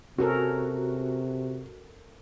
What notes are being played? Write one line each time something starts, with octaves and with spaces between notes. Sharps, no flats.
C3 C#4 F#4 A4 A#4